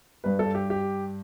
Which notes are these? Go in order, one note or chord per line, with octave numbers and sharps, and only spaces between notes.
G2 G3 B4
A4
G4
G4